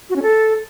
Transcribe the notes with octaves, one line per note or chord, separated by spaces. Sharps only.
F#4
C#4
A4